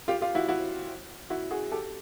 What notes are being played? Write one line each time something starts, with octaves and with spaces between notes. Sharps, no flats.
F4 G4
F4 G4
E4 F#4
E4 F#4
E4 F#4
F#4 G#4
G4 A4